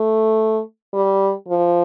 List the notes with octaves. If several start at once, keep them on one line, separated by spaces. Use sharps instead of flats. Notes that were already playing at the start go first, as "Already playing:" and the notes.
Already playing: A3
G3
F3